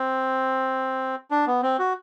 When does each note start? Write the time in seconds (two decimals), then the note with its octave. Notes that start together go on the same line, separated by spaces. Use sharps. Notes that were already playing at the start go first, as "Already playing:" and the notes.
Already playing: C4
1.31 D4
1.47 B3
1.62 C4
1.79 F#4